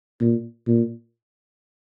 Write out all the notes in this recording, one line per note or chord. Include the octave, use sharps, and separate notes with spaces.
A#2
A#2